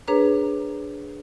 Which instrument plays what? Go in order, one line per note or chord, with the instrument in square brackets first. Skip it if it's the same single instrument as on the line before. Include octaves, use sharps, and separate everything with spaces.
[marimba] D4 G#4 A#4 B4 C#5 A#5